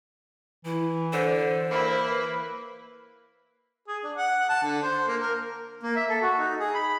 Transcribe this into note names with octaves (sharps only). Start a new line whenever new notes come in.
E3 E4
D3 C5
E3 A#3 E4
B4
G#4
D4
F#5
A5
D3
C5
A#3
A#4
A#3
E5
A4
F#4
D#4
G#4
B5